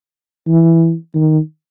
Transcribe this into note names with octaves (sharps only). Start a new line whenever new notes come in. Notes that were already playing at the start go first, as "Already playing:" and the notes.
E3
D#3